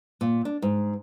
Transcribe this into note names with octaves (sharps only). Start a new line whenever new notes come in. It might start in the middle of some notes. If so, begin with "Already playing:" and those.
A#2
D4
G#2